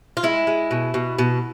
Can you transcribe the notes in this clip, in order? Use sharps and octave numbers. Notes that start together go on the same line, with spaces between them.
F4
G#3 E4
G#3
B2
B2
B2